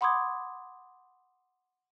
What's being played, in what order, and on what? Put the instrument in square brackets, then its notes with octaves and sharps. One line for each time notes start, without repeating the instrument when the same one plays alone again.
[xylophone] F#5 B5 C6 D6 D#6 G#6